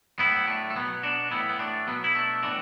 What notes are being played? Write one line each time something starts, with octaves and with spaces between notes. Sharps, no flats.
A2 F#3 B3 E4
A3 D4
A3
B2 F#3 B3
D4 F#4
A2 E3 B3 E4
B3
A3 D4
B2 F#3 B3
E4
A3 D4
A2 E3 D4 F#4